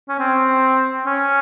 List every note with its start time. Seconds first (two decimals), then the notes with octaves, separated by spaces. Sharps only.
0.09 C#4
0.19 C4
1.06 C#4